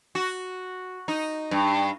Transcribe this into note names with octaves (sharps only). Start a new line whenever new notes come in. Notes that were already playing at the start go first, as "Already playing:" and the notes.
F#4
D#4
G2